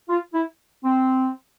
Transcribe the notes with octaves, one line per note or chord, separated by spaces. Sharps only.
F4
E4
C4